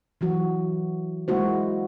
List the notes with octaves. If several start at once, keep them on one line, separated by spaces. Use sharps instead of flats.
E3 F#3 F#4
G#3 A#3 E4 F#4 C5